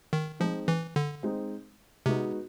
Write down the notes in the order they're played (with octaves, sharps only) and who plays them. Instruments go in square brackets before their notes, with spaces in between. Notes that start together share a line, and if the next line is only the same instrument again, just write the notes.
[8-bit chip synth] D#3
[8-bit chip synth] F3 [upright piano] G#3 C4 D#4
[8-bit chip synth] E3
D3
[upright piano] G#3 C4 D#4
[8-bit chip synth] C3 [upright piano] G#3 B3 D#4 F#4